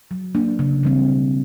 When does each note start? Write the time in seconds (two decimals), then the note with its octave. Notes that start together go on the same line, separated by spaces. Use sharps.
0.11 F#3
0.35 A#3 D4
0.59 C#3
0.83 E3 G3 C4
1.09 B2